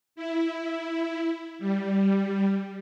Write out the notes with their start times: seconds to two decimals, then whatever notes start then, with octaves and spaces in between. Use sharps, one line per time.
0.16 E4
1.59 G3